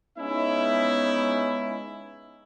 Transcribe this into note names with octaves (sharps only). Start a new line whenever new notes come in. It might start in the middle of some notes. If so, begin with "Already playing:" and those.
G#3 B3 C#4 D#4 E4 E5